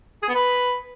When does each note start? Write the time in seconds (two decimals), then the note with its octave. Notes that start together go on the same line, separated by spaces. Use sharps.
0.23 G#4
0.29 B3
0.35 B4